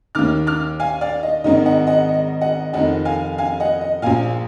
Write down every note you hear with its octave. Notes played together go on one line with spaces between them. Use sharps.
D#2 D#3 D6 F6
D6 F6
F5 G#5
D5 F5
D#5
G#1 G#2 D#3 D#5
D#5 F#5
D#5 F#5
D#5
D#5 F#5
F1 F2 D#3 D#5 F#5
F5 G#5
F5 G#5
D#5 F#5
D#5
A#1 A#2 F5 G#5